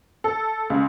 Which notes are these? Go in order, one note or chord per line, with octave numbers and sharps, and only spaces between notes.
A4
C#2